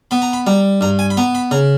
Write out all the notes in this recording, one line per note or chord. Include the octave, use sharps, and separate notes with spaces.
B3 B5
A#5
B5
G3 A#5
G2 A#5
G#5
B5
B3 A#5
B5
C#3 A#5